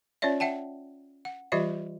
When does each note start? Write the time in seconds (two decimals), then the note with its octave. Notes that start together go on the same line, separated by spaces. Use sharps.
0.22 C#4 F4 C#5 D5 E5
0.40 E5 F#5 G5 A5
1.25 F#5
1.52 E3 G3 F4 G4 D#5 E5